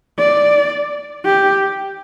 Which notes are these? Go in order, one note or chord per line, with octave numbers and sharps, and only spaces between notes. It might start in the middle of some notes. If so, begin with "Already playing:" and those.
D5
G4